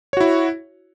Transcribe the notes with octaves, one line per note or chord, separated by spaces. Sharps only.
E4 F#4 C#5